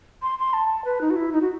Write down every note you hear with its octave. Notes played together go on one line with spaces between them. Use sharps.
C6
C6
A5
B4
D#4
F#4
E4
D#4
F#4